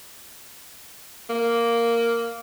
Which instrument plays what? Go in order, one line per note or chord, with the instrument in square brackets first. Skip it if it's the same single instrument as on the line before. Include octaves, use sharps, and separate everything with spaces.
[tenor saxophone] A#3